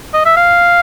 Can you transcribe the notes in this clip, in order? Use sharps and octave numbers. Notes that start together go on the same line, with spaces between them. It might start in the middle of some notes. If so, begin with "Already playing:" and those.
D#5
E5
F5